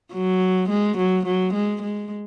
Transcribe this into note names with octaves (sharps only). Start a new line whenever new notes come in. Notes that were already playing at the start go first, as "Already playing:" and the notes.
F#3
G#3
F#3
F#3
G#3
G#3